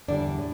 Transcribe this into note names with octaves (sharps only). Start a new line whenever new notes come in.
E2 D3 G3 D4
A2